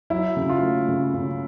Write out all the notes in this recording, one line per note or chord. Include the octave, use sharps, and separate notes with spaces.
F#3 E4
C#3
F4
A3
C#3
C#3